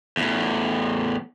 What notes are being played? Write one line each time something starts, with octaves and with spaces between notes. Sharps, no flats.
E2 A2